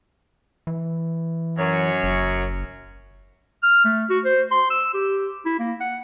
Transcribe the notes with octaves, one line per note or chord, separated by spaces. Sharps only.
E3
F#2 C#5
F#1
F6
A3
F#4
C5
C6
E6
G4
E4
A#3
F#5